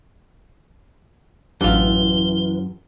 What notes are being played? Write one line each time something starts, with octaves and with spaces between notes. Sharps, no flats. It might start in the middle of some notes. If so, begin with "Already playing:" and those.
A1 F#2 E3 D4 F4 G7